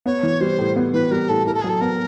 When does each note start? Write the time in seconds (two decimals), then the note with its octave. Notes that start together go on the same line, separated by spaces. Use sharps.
0.06 B3 C#5
0.23 E3
0.41 G3 C5
0.58 A2
0.76 B3
0.93 E3 B4
1.11 G3 A#4
1.29 A2 A4
1.46 E4 A#4
1.54 A4
1.61 G#4
1.64 F#3 A4
1.81 B3 A#4